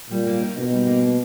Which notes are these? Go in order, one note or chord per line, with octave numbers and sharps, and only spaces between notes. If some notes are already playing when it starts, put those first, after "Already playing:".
A#2 G3
A#3
D#4
B2 D#4
G3
A#3
A#3